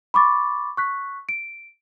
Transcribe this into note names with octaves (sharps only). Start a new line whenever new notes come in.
B5 C#6 D6 A6
C#6 F#6 B6
D7